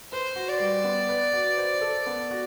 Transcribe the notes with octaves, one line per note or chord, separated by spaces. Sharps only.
B4 C5
F#4
D5
G3
B3
B4
F#4
C5
A4
B3
F#4